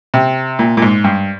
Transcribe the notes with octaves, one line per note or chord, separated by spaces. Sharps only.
C3
A#2
A#2
G#2
G2